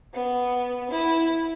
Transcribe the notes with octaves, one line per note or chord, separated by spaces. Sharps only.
B3
E4